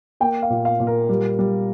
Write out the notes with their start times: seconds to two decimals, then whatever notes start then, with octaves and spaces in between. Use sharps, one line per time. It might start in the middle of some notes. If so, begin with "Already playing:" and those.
0.20 A#3 G5
0.42 F5
0.50 A#2
0.65 F5
0.80 A#2
0.87 A#4
1.09 G3
1.39 G3